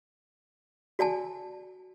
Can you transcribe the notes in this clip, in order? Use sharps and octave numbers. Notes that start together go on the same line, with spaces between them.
F#4 D5 G#5 A5